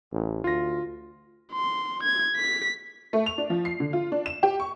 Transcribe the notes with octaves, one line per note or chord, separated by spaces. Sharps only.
A1
D2 F4 A#6
C6
G#6
B6
A3
F7
D4
F3
C7
D3
F4
D4
E7
G4
C#6